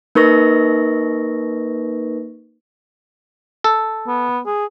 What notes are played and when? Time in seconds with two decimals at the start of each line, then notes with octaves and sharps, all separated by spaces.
0.15 A#3 D#4 A#4 B4 C#6 A#6
3.64 A4
4.07 B3
4.46 G#4